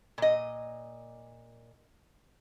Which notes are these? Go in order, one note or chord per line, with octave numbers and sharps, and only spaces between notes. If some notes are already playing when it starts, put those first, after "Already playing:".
A#2 D#5